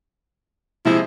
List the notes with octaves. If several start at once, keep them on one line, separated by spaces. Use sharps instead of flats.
C3 F3 G#3 E4